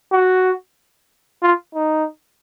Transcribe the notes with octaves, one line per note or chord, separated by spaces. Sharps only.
F#4
F4
D#4